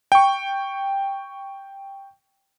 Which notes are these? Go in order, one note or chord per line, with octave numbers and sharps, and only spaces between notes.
G5 C#6